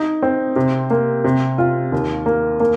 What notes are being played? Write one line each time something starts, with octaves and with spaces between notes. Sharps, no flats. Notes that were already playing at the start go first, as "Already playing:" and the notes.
Already playing: D#4
C4
C3
A#3
C3
F4
D#2
A#3
A#3